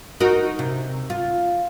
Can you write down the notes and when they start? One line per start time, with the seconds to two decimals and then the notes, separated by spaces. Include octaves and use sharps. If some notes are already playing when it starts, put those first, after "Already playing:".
0.20 D#4 F#4 A#4
0.59 C3
1.10 F4